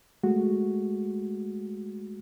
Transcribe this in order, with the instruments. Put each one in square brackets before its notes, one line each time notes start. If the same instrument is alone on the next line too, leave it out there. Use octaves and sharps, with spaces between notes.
[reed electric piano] G#3 A3 F#4